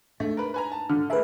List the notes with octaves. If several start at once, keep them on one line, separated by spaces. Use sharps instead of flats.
G#2 A3 D4
A#4 B4 B5
B4 G#5 A#5
A5
D3 F6
A3 G#4 A#4 B4 E5